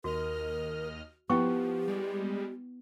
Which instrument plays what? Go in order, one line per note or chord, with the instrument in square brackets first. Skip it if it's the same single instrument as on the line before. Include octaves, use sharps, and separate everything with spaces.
[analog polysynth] D#2 D#5 F6 [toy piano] F#4 [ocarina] A#4
[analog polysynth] F3 [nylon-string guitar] B3 [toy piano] E4 G5 C#6 [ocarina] G4
[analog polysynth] G3 G#3